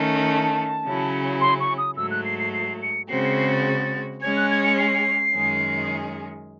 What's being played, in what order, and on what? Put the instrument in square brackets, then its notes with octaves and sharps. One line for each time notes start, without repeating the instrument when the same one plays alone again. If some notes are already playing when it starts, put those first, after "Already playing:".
Already playing: [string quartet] D#3 A3 C#4
[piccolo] A5
[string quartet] C#3 F#3 C#4 E4
[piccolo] C6
C#6
D#6
[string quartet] G#2 F#3 A3 [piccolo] E6
[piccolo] F#6
C7
C7
C7
C#7
[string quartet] C#3 G#3 C4 F#4 [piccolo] C7
[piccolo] C7
C7
A6
[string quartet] G#3 C#4 G#4 C#5 [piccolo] G#6
[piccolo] F#6
G#6
C#7
C7
[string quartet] F#2 D#3 G#3 C#4 G#4